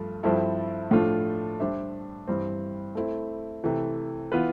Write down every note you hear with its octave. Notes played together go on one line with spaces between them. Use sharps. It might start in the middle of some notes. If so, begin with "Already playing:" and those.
Already playing: G2 F3 A3
G2 F3 C4 E4 A4
A2 F3 A3 D4 F4
G3 D4 G4 C5 E5
G2 E3 G3 C4
A3 C4 E4
C3 E3 A3
E3 B3 F4 B4